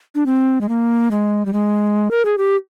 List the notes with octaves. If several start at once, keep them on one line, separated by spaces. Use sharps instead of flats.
D4
C4
G#3
A#3
G#3
G3
G#3
A#4
G#4
G4